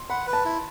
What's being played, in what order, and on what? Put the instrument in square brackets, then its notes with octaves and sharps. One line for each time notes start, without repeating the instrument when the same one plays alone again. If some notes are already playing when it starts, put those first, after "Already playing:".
Already playing: [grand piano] C6
[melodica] F#5 [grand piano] B5
[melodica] B4
[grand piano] A5
[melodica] E4